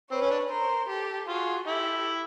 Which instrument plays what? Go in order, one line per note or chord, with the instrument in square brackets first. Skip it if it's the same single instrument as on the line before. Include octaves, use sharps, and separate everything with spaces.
[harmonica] C4 [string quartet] B4 C#5
[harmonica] C#4
D4
[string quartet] A#4 C5
G4 A4
[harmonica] F4 [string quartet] F#4 G#4
[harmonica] E4 [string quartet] G4 A4